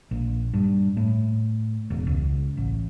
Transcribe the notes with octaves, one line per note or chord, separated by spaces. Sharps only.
A#1
G2
A2
E1
C#2
A1